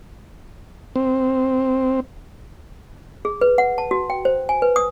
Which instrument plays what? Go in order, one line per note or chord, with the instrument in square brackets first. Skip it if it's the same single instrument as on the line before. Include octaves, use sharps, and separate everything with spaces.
[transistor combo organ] C4
[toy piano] G#4
B4
F#5
A5
F#4
G5
C5
G#5
B4
D#6